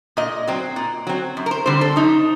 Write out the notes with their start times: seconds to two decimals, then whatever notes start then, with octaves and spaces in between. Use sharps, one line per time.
0.17 A#2 D#5
0.47 F#3 C4
0.76 A#2
1.07 F#3 C4
1.37 F#2
1.46 A#4
1.51 C5
1.66 D3 G3 C4 C5
1.81 A4
1.96 F#2 D#4